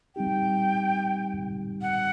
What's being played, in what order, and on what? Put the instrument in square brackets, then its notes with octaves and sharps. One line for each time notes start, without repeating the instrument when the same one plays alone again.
[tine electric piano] G3 C4 D#4 G4 [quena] G5
[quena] F#5